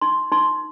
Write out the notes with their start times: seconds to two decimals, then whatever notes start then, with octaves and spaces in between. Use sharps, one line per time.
0.01 D#4 C6
0.32 D#4 C6